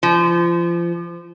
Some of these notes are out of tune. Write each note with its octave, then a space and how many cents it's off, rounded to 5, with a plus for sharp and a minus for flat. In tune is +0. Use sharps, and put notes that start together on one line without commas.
F3 -30